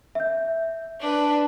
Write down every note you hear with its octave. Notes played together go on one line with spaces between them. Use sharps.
E5 G6
D4 B4